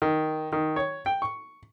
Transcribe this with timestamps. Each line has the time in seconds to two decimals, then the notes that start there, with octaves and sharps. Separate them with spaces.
0.02 D#3
0.53 D#3
0.76 C#5
1.06 G5
1.22 C#6